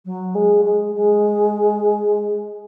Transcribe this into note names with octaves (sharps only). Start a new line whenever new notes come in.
F#3
G#3
G#3
G#3